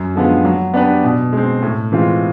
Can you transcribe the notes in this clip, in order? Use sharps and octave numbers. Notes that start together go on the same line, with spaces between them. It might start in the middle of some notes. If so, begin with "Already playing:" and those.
Already playing: F#2
D3 F3 G#3 B3
F#3
B3 D4 G4 B4
B2
G#3 C4
A2
E3 G#3 C4 F4